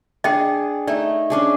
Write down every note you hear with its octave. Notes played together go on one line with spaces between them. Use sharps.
D4 G#4 D#5 G5
A3 D#4 D5
C#4 D4 G#4